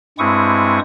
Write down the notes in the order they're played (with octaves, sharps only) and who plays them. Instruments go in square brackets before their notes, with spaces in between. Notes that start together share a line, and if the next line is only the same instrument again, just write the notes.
[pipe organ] G2 G#3 C4 E4 C#6 D#6